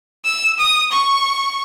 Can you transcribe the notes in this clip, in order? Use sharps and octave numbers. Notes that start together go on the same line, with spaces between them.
E6
D#6
C#6